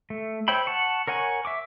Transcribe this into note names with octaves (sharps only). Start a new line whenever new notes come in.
A3
C5 C#5 E5 G5 B5
F#5 A5 C#6
A#4 C#5 F#5 G#5 C#6
E5 C#6 D6